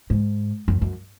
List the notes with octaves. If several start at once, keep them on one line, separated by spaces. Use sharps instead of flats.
G#2
F#2
F#2